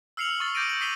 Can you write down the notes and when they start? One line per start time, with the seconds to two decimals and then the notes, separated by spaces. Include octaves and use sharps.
0.17 E6 F6 C7 C#7 F7 F#7
0.40 C#6 D#6 F6 A6 G7
0.55 D6 G6 A6 A#6 D7 D#7
0.69 F#7
0.81 D#6 B6 C7 D#7 F7 G7